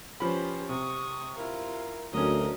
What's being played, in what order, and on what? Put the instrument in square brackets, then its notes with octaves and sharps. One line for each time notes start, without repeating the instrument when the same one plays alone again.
[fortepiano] F3 B5 [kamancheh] C#4 B4 [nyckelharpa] G4 C5
[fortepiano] C3 [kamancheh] C#6 [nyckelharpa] D#6
[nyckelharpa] E4 F4 [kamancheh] A#4
[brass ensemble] D2 [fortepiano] F#3 C#4 [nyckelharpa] D4 D#5 [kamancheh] A#4